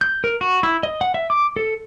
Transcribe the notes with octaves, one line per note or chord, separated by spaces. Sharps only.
G6
A#4
F#4
E4
D#5
F#5
E5
D6
A4